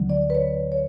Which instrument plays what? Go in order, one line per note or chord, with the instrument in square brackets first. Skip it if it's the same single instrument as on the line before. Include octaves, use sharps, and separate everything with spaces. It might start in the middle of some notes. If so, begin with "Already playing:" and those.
Already playing: [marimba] D2 D3 F#3
D5
B4
C#5
C#5